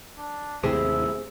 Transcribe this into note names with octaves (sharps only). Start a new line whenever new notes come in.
D4
D#2 A2 C3 E4 G4 G#4 C5